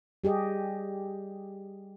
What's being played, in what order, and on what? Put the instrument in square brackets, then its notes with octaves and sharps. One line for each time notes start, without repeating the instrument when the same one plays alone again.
[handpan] G3 G4 G#4 D#5